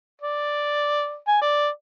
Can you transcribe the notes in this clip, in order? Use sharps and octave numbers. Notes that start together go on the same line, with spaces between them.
D5
G#5
D5